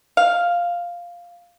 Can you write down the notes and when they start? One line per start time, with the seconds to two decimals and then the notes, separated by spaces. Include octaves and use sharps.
0.17 F5